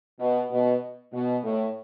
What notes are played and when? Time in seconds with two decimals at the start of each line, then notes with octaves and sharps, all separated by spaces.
0.20 B2
0.51 B2
1.13 B2
1.43 A2